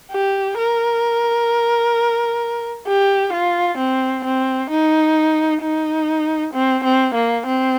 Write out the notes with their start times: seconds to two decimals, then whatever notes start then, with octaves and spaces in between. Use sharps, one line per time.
0.12 G4
0.57 A#4
2.87 G4
3.33 F4
3.78 C4
4.24 C4
4.70 D#4
5.62 D#4
6.53 C4
6.84 C4
7.14 A#3
7.46 C4